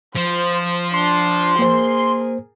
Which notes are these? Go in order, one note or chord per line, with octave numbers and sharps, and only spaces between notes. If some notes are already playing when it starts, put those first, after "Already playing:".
F3 C5
D4 C6
A#3 G#4 A#4 C5